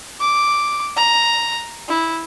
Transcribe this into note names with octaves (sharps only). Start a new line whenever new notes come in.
D6
A#5
E4